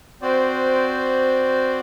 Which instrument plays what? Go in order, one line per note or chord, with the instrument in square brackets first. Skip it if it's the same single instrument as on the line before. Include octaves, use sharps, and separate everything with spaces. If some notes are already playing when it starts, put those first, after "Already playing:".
[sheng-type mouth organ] C4 F#4 C5 D5